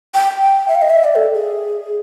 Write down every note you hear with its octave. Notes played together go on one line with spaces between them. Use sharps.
G5
G5
E5
F5
D#5
E5
D5
A4
G#4